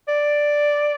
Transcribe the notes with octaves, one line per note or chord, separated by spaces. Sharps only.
D5